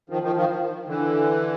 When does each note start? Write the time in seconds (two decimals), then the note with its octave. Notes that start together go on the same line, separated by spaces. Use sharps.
0.10 D#3 F3
0.23 D#3 F3
0.36 D#3 F3
0.88 D3 E3